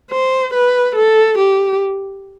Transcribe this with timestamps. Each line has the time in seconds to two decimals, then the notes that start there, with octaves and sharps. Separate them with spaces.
0.11 C5
0.54 B4
0.95 A4
1.38 G4